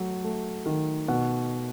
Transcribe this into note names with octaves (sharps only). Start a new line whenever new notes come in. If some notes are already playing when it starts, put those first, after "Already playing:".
Already playing: F#3 A3
A3
D#3
B2 F#5